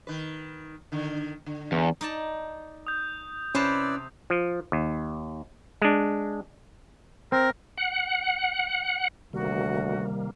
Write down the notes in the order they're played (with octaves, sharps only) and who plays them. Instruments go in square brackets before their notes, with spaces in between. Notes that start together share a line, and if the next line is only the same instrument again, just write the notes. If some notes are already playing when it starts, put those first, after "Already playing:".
[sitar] D#3 B4
D3 D#3
D3
[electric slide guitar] E2
[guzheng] D#4 D5 A5
[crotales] D#6 G6
[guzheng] C3 C5 A5 [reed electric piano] C#4 [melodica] E4 B4 D5
[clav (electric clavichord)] F3
D#2
G#3 D4
[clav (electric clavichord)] C4 [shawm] A#4
[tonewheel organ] F#5
[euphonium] D2 [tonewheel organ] C3 D#3 A#3 [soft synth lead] G3 [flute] F#4